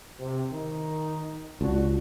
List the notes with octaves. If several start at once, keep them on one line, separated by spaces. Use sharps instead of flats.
C3
D#3 D#4
C#2 D4 F#4